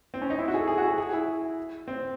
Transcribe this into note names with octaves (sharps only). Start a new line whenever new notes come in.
C4
C#4
D#4
E4
F#4
G#4
A4
G#4
F#4
G#4
G#4
E4
C4